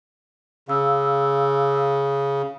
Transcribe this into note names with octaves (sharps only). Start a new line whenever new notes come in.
C#3 F5 E6